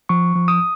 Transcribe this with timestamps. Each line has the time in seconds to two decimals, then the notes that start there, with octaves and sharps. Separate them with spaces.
0.09 F3 C#6
0.35 F3
0.48 D#6